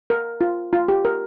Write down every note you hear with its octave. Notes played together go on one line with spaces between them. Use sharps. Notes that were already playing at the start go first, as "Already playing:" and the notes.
A#4
F4
F4
G4
A#4